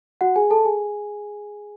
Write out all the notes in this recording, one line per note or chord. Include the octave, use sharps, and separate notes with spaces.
F#4 F#5
G#4 G#5
A4 A5
G#4 G#5